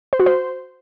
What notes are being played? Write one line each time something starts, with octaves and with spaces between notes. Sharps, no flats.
C5
F#4
C5